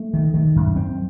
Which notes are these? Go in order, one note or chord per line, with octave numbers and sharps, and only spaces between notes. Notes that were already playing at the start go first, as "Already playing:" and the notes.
Already playing: A3
D#3
D#3
F#2
C4